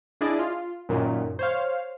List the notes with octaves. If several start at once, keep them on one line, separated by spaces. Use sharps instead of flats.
D4 E4 G#4 D5 D#5
F4
F#2 A#2 D#3 F#3
C5 C#5 F5